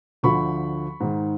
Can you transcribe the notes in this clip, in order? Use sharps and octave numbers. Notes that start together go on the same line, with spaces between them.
D2 D3 F3 B5 C#6
G#2 D#3